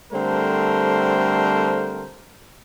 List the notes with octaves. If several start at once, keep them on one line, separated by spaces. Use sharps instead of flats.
D3 G3 A3 C4 A#4 C5